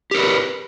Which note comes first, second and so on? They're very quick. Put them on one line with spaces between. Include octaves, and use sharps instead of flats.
G4 A#4 B4